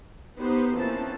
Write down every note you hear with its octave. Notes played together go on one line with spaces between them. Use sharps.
B3 D#4 G4 B4 C5
E3 F3 A#3 C4 C#4 A5